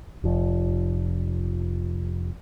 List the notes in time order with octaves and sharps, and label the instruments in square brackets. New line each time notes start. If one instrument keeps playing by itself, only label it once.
[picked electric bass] F1 F3